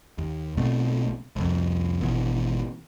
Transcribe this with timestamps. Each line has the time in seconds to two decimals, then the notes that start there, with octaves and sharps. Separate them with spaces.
0.18 D#2
0.57 B1 B2 A3 C4
1.36 C2 F2
2.01 G#1 B2 E3